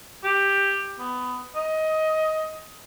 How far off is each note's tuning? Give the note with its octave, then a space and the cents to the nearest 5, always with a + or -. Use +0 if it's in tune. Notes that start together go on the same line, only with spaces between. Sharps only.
G4 +10
B3 +20
D#5 +15